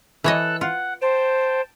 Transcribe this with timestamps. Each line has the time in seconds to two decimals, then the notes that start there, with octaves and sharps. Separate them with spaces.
0.24 E3 A4 C#5 D#5 E6 F#6
0.61 F4 F#5
1.02 C5 G5 A5